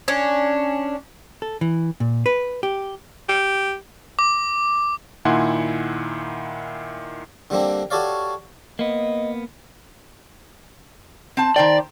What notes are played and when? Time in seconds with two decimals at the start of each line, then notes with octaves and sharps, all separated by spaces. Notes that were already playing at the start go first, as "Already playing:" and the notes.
0.08 C#4 D4
1.42 A4
1.61 E3
2.00 A#2
2.26 B4
2.63 G4
3.29 G4
4.19 D6
5.25 A#2 D#3 E4 F#5 G#5 C6
7.50 D3 G3 A#3 C4 D4
7.90 F#4 G4 A4 C#5 D5 F5
8.79 A#3 B3 D#5
11.37 C4 A5
11.56 D#3 C5 D5 G5